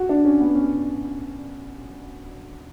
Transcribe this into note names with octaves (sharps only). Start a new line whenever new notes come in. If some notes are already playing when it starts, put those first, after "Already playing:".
Already playing: F#4
D4
C#4
B3
C#4